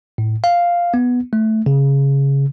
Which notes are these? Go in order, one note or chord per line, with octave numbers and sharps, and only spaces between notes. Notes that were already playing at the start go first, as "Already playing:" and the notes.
A2
F5
B3
A3
C#3